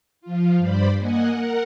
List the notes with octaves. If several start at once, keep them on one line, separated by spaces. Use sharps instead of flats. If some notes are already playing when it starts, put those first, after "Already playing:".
F3 F4
G2 C5 D5 B5
A#3 D#5 F#5 G#5
A#4 F#5